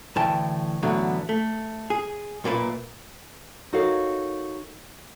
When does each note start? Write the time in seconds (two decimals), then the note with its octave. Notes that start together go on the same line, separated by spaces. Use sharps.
0.16 D2 A2 E3 G5 A5
0.83 A2 D3 E3 F#3 B3
1.29 A3
1.90 G#4
2.44 B1 A#2 A#3 B4 E5
3.73 D#4 F#4 A4 A#4 C#5 F5